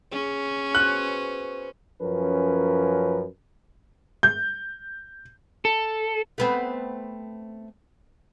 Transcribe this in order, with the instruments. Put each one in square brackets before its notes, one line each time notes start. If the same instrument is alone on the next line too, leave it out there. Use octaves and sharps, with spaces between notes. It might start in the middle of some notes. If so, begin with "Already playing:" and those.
[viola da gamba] C#4 [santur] G#4
[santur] B3 F#4 C5 [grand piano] F#6
[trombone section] F#2 F3 C#4 A#4 B4
[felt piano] G6
[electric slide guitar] A4
[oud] A3 B3 C4